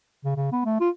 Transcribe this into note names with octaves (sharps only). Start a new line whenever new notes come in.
C#3
C#3
B3
A3
F4